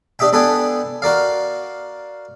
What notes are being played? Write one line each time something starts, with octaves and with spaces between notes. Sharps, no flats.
D4 G4 D#5 E5 G5
B3 D4 A4 B4 G5 G#5
F#4 A#4 D5 F5